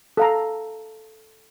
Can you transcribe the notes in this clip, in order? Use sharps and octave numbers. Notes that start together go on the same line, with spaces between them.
A4 F5 A#5